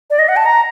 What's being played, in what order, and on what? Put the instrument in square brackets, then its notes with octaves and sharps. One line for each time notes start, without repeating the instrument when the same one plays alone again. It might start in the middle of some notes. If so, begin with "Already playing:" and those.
[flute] D5
D#5
F#5
A5
A#5